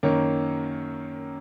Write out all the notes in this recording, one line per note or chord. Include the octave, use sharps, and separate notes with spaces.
F#2 D#3 A#3 C#5